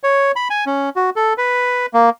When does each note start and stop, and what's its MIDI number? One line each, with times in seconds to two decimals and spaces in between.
0.04 0.32 73
0.36 0.48 83
0.50 0.65 80
0.66 0.89 61
0.96 1.10 66
1.16 1.33 69
1.38 1.86 71
1.94 2.10 58